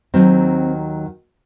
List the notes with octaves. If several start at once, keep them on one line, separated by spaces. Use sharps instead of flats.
D#2 D#3 F#3 C4